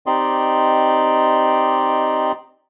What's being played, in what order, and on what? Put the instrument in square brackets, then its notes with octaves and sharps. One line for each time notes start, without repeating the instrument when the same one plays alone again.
[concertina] C4 D#4 G4 D5 D#5 C6